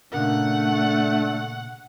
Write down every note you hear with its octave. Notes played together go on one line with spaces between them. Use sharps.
A#2 C#3 A3 D4 A#4 F#5